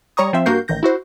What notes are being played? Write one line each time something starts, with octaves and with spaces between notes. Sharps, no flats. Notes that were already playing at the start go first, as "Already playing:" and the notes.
G3 C#5 A#5 C#6 D#6
F3 C4 C5 E5
G2 A#3 F#4 A#4 G6 C7
A1 D#3 G6 A#6
E4 F#4 C5